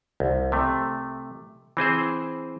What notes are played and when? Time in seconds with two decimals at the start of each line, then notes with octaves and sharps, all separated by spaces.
0.20 C2
0.52 C3 A3
1.77 E3 C4 G#4 C5